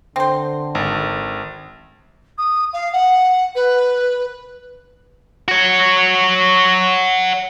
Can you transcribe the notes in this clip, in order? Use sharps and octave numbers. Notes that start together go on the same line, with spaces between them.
D3 C4 C5
G#1
D#6
F5
F#5
B4
F#4 C#5